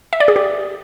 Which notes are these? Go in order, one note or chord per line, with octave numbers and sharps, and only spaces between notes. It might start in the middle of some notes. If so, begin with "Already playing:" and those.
E5
D5
G#4
G4